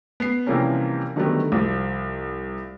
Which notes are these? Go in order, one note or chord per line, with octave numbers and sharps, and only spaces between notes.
B3 C7
C3 E3 F3 G3 A#3 C#4
D3 D#3 F#3 G3 A3 B3
C2 F3